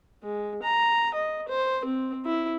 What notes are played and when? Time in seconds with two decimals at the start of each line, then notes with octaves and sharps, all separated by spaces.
0.23 G#3
0.62 A#5
1.14 D#5
1.48 C5
1.85 C4
2.25 E4